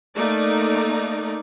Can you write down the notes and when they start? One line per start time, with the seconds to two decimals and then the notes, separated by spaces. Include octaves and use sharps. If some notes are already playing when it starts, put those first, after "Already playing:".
0.16 A3 A#3 D#4 D5